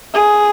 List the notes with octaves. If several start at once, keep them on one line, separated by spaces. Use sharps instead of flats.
G#4